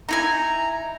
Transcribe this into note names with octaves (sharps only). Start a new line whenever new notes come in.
D#4 E4 G#5 A#5